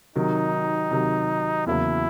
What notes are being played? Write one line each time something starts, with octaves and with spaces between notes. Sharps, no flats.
C3 D#3 F#3 D#4
C3 D#3 F#3
E2 C#3 F#3 A#3 E4